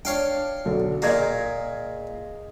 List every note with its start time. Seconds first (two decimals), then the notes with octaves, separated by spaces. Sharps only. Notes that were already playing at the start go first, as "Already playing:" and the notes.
0.05 D4 C#5 F5 G5
0.65 B1 D3 A4
1.02 A#2 A#3 G#4 D#5 G#6